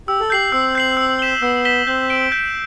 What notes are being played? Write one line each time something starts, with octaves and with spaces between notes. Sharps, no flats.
G4 E6
A4
G4 G6 C7 F#7
C4 E6
G6 C7 F#7
E6
B6 E7 G7
B3 E6
B6 E7 G7
C4 G6
D7 G7
G6